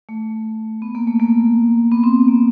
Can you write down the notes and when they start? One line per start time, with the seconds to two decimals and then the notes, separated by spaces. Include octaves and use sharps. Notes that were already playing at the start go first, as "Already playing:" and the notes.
0.09 A3
0.82 B3
0.95 A#3
1.07 A3
1.20 A#3
1.91 B3
2.04 C4
2.28 A#3